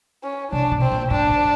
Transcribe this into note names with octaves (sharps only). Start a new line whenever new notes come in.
C#4
C3 D4
B2
C4
A#2
A2 D4
G#2